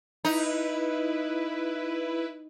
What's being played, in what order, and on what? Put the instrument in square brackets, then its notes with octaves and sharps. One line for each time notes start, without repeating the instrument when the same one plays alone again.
[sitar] D#4 [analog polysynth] E4 B4